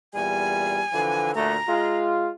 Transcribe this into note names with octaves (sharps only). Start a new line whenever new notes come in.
E2 A#2 G3 G#5
D3 E3 F3
D2 A#2 A3 A#5
G#3 F4